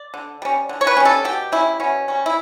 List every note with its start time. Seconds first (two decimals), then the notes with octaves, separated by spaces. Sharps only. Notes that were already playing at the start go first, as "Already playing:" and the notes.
Already playing: D5
0.14 D3
0.42 G3 C#4
0.69 D3
0.81 C#5
0.87 B4
0.97 G3 C#4
1.05 A4
1.24 B2 G4
1.52 G3 C#4 E4
1.80 B2 C#4
2.08 G3 C#4
2.26 E4